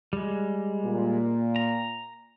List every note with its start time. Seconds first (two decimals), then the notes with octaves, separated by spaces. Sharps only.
0.13 G3 G#3
0.85 A#2
1.56 A#5